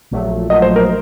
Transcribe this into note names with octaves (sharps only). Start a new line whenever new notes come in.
A#1 A#2 F#3 A3
A#1 A#2 F#3 A3 D#5
C5
A#4